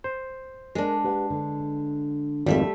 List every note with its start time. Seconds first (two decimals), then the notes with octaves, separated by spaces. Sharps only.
0.04 C5
0.75 G#3 D4 G#4 A#4
1.04 G4 B4 F#5
1.30 D3
2.46 G#1 F2 G3 A3 E5